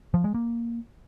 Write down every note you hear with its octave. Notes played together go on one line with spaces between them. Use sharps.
F3
G#3
A#3